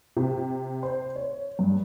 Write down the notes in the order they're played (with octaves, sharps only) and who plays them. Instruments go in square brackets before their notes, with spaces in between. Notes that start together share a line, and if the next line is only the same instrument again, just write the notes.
[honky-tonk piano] C3
C5
C#5
G2